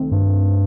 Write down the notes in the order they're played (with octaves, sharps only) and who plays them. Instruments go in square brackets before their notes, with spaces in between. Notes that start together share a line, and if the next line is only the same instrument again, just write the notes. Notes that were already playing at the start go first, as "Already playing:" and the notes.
Already playing: [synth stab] C2 D#3 A3 C4
[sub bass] G2